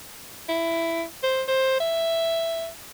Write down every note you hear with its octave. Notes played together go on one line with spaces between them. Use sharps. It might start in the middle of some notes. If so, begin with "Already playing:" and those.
E4
C5
C5
E5